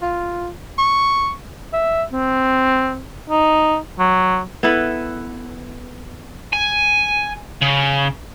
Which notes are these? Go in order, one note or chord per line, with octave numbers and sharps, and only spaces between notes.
F4
C#6
E5
C4
D#4
F#3
B3 E4 A4 B4
G#5
C#3